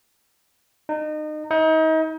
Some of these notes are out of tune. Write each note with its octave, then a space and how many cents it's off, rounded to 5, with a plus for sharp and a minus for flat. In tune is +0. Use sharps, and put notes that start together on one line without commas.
D#4 -30
D#4 +35